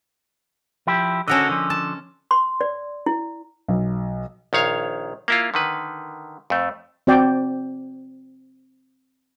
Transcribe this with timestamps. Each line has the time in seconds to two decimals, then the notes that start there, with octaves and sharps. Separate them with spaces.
0.87 F3 E4 G4
1.28 D3 C#4 F#4 A4 A#4 D#5
1.49 D3 F3
1.70 A5
2.31 C6
2.61 D5
3.06 E4
3.68 B1
4.53 A#1 D#3 C#5 F5
5.28 A#3 E4 F4
5.54 D3 D#3 B4
6.50 F2 A3
7.07 C4 F#4 D5 G5